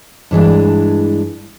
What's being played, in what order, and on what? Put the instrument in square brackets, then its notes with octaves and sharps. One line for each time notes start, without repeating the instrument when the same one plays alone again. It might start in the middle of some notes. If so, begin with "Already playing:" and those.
[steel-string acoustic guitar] G2 E3 G#3 D4